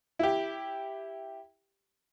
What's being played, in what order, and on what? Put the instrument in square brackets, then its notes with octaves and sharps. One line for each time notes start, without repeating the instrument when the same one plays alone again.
[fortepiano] E4 G4